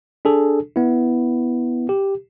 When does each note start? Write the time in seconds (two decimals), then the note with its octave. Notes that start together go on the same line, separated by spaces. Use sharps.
0.25 D4 G#4 A4
0.76 B3 E4
1.89 G4